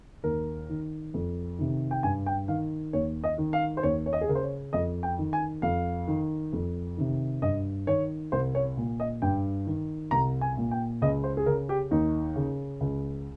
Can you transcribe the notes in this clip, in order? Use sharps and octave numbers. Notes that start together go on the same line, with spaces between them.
D#2 A#4
D#3
F2
C3 D#3
G5
G2 G#5
G5
D#3 F5
D#2 C#5
D#5
D#3
F5
C5
D#2 C#5
C#5
D#5
G#4
C#3 A#4
C5
C#5
F2 D#5
G5
D#3
G#5
F2 F5
D#3
F2
C3 D#3
G2 D#5
D#3 C#5
C2 C5
C#5
A#2
D#5
G2 G5
D#3
C2 A#5
G#5
A#2
G5
C#2 D#5
C5
G#4
C#3 A#4
G4
D#2 D#4
C#3
C#2